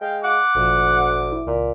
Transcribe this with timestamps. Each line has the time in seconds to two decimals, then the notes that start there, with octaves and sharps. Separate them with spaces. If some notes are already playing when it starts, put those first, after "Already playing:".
0.01 G#3 F5 G5
0.24 F5 F#5 D6
0.55 G#1 D2 A#2 F3
1.32 E4
1.47 C#2 A#2